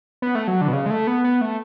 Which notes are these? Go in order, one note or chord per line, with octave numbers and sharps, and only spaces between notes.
B3
A3
F#3
D3
B2
C#3
G#3
A3
B3
B3
A3